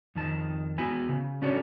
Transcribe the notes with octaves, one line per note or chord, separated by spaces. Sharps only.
F2 D#3 A5
B3 E4 F#4 B4 G#5
C#3
C#4 D4 F#4 A4 C#5